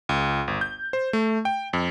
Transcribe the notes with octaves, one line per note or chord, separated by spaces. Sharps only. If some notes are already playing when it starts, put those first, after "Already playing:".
C#2
G1
G6
C5
A3
G5
F2